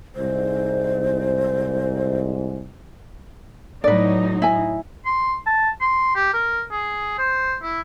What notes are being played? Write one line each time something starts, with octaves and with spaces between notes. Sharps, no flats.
C2 G#2 C5
A2 F#3 D#4 B4 D5
E4 G#5
C6
A5
C6
G4
A#4
G#4
C5
E4